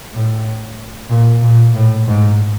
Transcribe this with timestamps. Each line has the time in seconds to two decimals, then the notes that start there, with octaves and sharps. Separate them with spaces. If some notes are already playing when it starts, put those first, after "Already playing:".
0.13 A2
1.10 A#2
1.42 A#2
1.74 A2
2.08 G#2